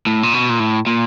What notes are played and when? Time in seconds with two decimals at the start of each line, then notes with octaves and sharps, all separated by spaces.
0.07 A2
0.23 A#2
0.34 B2
0.50 A#2
0.60 A2
0.87 A#2